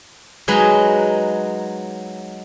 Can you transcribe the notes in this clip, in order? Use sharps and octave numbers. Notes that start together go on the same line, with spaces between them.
F#3 G#3 D#4 B4